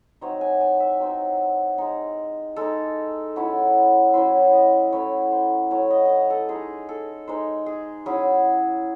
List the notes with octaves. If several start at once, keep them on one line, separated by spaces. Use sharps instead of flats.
F#3 C4 D#4 C#5
G#5
G#5
E5
F#3 C4 D#4
G#3 D#4
G#3 D#4 A4
F#3 C#4 E4
F#3 C#4 E4 C5
D#5
F#3 A3 C#4 E4 C#5
C5
F#3 A3 C#4 E4 C#5
D#5
C#5 D#5
A4
G#3 D#4 G#4
A4
G#3 D#4 C5
G#4
F#3 C#4 E4 G#4